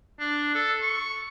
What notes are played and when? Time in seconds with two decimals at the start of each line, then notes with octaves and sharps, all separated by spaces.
0.20 D4
0.55 A4
0.81 C#6